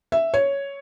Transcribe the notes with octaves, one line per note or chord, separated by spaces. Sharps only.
E5
C#5